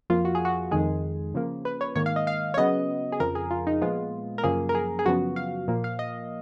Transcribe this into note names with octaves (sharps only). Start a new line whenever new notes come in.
F2 F3 A#3 F4
F#4
G#4
F#4
F2 D#3 G#3 G#4
C#3 F3 A#3
B4
C#5
G#2 D#3 A#3 C#5
F5
D#5
F5
C#5
C#3 F#3 B3 D#5
G#4
F2 C#3 F3 A#4
G#4
F4
D#4
A#2 F3 G#3 B3 F4
A#4
F#2 C#3 F3 A#3 G#4
A#4
G#4
G#4
F#2 C#3 F3 B3 F#4
F5
A#2 F3 A#3
F5
D#5